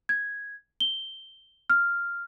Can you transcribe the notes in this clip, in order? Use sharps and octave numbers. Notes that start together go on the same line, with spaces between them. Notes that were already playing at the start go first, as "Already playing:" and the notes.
G#6
G7
F6